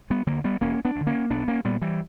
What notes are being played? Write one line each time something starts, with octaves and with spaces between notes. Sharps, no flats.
G3 B3
D2 D3 F#3 A#3
G3 B3
E1 A#3 C#4
B3 D4
D2 D3
A#3 C#4
B1 B3 D4
A#3 C#4
A#2 G3 B3
E3 G3